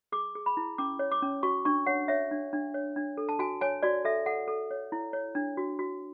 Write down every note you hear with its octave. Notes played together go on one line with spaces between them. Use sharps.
G#4 D6
G#4
B5
E4
C#4 D6
C#5
D6
C#4
F#4 C#6
D4 C#6
C#5 F#5
C#5 E5
D4
D4
C#5
D4
A4
A5
F#4 G#5
C#5 G#5
F#4 D5
A4 E5
A4 F#5
A4
C#5
E4
C#5
D4
F#4
F#4